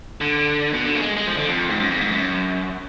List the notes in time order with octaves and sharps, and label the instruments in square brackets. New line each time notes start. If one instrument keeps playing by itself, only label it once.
[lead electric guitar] D3
B2
D3
A#3
G#3
G#3
F3
D3
F2
G#2
F#2
F2
G#2
F#2